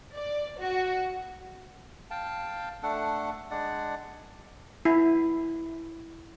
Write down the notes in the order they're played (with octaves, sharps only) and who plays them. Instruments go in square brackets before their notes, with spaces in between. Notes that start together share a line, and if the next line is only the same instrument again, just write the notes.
[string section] D5
F#4
[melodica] F5 G5 A5
A3 D4 A4 F#5
G#3 D4 D5 F#5
[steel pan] E4